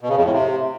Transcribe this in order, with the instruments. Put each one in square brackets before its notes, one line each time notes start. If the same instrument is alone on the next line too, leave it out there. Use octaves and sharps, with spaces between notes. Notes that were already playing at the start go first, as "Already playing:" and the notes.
[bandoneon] B2
C#3
F2
A2
C3